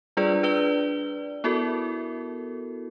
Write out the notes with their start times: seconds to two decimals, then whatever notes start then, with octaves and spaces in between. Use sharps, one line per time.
0.17 G3 D4 F4 G#4 B4 D5
0.43 D4 B4 D5 G7
1.44 B3 E4 F#4 A4 A#4